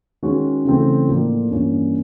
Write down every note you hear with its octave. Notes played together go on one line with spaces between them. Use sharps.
D#3 G#3 C#4 F#4
C#3 E3 A3 C4
A2 F3 A#3 D4
G2 E3 G3 A#3 C#4